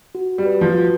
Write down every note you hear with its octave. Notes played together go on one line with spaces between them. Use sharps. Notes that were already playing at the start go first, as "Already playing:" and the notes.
F#4
G3
B4
F3
F#4